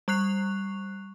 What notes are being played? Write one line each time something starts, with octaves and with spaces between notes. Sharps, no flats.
G3 C#6 F#6 C7 F7